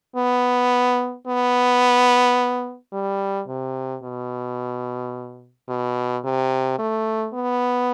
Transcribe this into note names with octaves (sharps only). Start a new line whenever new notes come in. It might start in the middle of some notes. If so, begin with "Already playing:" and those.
B3
B3
G3
C3
B2
B2
C3
A3
B3